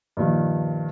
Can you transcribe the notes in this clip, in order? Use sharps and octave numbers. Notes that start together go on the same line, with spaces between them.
G2 A#2 D#3 F3